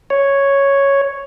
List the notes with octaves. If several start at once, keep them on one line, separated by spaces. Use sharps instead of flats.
C#5